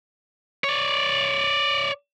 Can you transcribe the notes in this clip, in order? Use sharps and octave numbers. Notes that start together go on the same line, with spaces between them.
C#5 D5